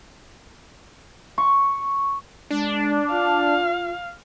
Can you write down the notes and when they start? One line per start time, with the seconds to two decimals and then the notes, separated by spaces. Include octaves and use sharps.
1.38 C#6
2.51 G#3 D4
3.11 F4 F5